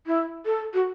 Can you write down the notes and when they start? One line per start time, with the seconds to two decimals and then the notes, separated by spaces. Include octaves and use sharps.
0.07 E4
0.45 A4
0.74 F#4